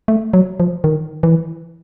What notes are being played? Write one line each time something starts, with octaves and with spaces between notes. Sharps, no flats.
A3
F#3
F3
D#3
E3